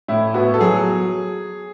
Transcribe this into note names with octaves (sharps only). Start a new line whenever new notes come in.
A2 E4
B3 F#4
A4
F#3 G#4